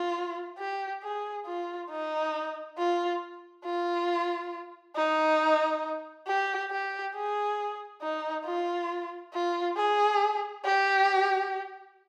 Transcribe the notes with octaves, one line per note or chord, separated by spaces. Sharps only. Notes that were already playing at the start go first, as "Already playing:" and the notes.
Already playing: F4
G4
G#4
F4
D#4
F4
F4
D#4
G4
G4
G#4
D#4
F4
F4
G#4
G4